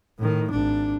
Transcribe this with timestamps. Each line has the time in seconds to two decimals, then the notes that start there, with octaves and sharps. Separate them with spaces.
0.19 A2 D#3
0.51 G#1 D4